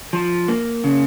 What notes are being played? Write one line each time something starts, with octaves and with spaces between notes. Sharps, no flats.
F3
A#3
C#3